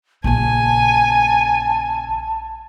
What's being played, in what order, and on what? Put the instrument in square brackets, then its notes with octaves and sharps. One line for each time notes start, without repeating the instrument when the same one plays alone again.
[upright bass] A#1 C#3 [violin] G#5 [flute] A5